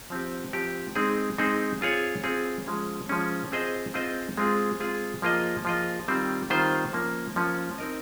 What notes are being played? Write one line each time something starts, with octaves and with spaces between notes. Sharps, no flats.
F3 C4 G4
F3 C4 G4
G#3 C4 D#4 G#4 C5
G#3 C4 D#4 G#4 C5
C4 F4 G#4 C#5
C4 F4 G#4 C#5
F3 G#3 C#4
F3 G#3 C#4
C4 F4 G#4 C5 D#5
C4 F4 G#4 C5 D#5
G#3 C4 F4 G#4
G#3 C4 F4 G#4
F3 A#3 F4 G#4 D#5
F3 A#3 F4 G#4 D#5
D#3 G3 C4 F4 C5
D#3 G3 C4 F4 C5
F3 A#3 C#4
F3 A#3 C#4
C4 D#4 A#4 D#5